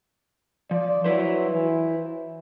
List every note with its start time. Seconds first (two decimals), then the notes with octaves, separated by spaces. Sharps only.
0.71 F3 D5
1.04 F#3 E4 B4 C5
1.51 E3